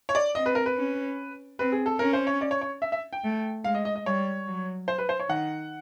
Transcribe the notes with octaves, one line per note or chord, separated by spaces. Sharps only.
C#5
D5
C4 D#5
B4
A#4
B4
C#4
C4 B4
G#4
A4
C#4 A#4
C5
C#5
D5
C#5
C#5
E5
E5
G5
A3
G#3 F5
D#5
D#5
D#5
G3 C#5
F#3
C5
B4
C5
C#5
D#3 F#5